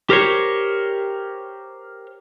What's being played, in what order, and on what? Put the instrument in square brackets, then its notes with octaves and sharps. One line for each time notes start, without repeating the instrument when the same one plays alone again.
[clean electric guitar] G4 A#4 C5 C#5